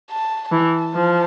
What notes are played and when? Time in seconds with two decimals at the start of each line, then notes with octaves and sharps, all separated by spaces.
0.11 A5
0.52 E3 A5
0.93 F3